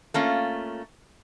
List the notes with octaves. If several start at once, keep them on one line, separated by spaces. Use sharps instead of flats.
A3 A#3 C#4 F4